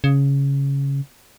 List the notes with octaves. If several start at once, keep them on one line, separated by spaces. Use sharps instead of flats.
C#3